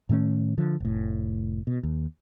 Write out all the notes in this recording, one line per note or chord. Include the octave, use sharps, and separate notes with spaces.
A2 D#3 A3 C#4
D3 F3
F1 A2
B2
D#2